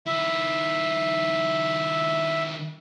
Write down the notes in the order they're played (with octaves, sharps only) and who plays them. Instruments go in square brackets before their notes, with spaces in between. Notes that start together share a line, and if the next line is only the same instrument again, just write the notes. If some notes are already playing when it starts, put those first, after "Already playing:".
[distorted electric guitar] D#3 E4 [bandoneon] E5